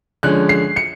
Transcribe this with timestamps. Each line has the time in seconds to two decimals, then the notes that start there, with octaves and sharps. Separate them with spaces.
0.23 D3 F3 G#3 C#4 F#6
0.49 C7
0.76 C#7